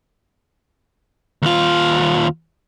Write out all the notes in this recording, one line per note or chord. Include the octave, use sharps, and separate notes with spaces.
D#2 F4